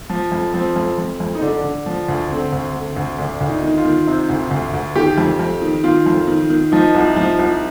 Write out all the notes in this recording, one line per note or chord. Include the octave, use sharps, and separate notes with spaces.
F3
F2
F3 C4
F2
F2
F2
D#4
D3 D4
D3
F3
D2
D3 C4
D2
D3
D2
D2 D4
D2
D#4
D#3
F4
D#3
C3
D2
D2
D2
D#3 G4
F2
F2
D#3
D#3 F4
F2
D#3
D#3
F3 D#4
C2
F3
C2